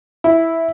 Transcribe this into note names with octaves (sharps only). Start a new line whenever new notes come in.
E4